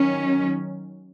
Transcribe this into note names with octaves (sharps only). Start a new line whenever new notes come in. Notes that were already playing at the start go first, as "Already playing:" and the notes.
Already playing: D#3 F#3 C#4